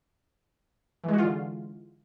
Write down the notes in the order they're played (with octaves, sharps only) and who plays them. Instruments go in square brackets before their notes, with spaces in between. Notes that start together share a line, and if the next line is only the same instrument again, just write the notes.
[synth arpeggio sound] E3
G#3
F#4
F4
D3